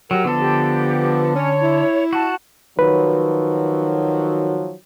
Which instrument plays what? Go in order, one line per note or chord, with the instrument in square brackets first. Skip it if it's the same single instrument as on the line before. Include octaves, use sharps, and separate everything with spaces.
[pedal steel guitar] F#3 [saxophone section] G4 A#4
[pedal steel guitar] D3 A4 [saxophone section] F3 B3
[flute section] G4
[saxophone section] C#4 [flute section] C#5
[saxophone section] E4
[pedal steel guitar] F#4 [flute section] A5
[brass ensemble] D#3 F3 F#3 [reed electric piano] B4